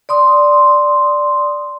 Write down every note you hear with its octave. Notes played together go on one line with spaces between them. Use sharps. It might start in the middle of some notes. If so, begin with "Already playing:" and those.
D5 C6 D#6